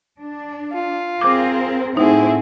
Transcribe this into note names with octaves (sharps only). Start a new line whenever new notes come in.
D4
F4
C4 G#4 A#4 D6
A2 C4 D#4 E4 F#4 G#4